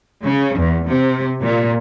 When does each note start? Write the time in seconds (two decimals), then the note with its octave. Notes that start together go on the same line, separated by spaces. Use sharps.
0.24 C#3
0.58 E2
0.87 C3
1.41 A#2